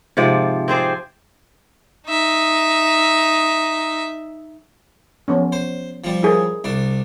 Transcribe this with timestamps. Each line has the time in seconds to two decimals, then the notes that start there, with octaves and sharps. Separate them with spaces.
0.17 G#2 C3 F3 D5
0.68 C4 G#4 C5 D5
2.07 D#4 E5
5.28 F3 B3 C#4
5.52 C5
6.04 F3 G3
6.23 E4 G#4 A#4
6.64 C2 D4